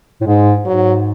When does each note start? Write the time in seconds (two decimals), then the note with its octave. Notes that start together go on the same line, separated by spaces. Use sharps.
0.21 A2
0.26 G#2 G#3
0.65 G#2 F#3